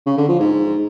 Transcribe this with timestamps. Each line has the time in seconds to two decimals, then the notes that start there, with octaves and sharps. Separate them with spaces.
0.06 C#3
0.18 D3
0.29 F3
0.40 G#2